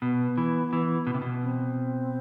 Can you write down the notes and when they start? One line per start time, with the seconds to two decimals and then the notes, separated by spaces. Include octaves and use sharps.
0.02 B2 B3
0.38 E3
0.73 E3
1.07 B2
1.14 C3
1.22 B2
1.43 C4